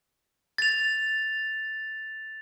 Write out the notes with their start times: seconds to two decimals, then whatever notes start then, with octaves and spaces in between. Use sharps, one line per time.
0.58 A6 F7